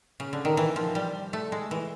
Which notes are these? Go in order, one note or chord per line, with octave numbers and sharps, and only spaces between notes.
C#3
D3
D#3
E3
F3
G3
A3
G#3
E3